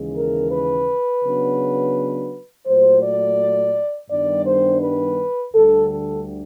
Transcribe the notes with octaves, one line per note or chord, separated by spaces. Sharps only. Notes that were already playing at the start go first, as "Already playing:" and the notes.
Already playing: D#2 C#3 E3 G#3
A#4
B4
C#3 F#3 B3 D4
A#2 F#3 A3 C5
D5
G2 D#3 G3 B3 D4 D5
C5
B4
D2 D3 G3 A4
A4